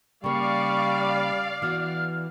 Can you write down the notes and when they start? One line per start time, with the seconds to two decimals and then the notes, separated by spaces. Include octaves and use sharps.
0.24 C#3 G3 A#3 D5 F5 C#6
1.62 E3 B3 F#4 F6